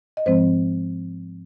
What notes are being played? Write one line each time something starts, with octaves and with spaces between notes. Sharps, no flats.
D#5
G#2 F3 G#3 C4 C5